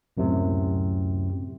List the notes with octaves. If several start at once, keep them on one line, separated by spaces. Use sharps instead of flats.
C#2 F#2 A2 C3